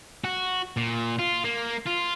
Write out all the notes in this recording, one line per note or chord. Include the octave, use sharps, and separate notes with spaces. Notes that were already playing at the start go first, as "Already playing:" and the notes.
F#4
A#2
F4
A#3
F4